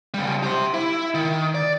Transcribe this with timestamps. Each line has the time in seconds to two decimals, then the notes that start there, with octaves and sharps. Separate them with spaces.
0.14 C#3 G3
0.43 G4 C5
0.74 E4
1.14 D#3
1.55 D5